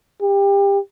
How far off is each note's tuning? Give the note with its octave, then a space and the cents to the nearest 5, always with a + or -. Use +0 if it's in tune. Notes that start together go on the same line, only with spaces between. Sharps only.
G4 +25